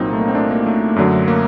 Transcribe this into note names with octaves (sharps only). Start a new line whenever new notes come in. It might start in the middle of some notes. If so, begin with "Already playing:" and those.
Already playing: C2 A#2 F#3 C4 D#4
A3
A#3
C4
A#3 D4
A#3
A3
F#2 D3 F#3
A#3